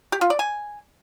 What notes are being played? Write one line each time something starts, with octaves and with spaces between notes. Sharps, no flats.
G4
F4
D5
G#5